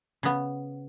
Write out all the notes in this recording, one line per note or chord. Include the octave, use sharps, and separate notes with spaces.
C#3 B3